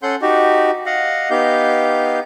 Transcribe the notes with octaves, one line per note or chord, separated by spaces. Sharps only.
C#4 A4 F#5 C6 G6
D#4 F#4 G4
D#5 F5 F#5
B3 D#4 G4 F5 G6